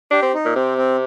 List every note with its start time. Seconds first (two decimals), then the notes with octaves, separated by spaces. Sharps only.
0.11 D4 G4
0.22 C4
0.34 D#4
0.45 A#2
0.56 C3 C4
0.78 C4